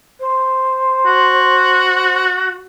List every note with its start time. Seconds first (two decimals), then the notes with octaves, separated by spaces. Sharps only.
0.20 C5
1.05 F#4